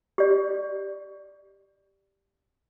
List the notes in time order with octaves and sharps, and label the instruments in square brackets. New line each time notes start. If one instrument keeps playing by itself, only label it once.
[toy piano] G4 D5